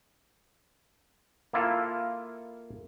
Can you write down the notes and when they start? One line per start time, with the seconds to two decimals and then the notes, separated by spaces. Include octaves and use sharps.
1.53 A#3 E4 F4 A4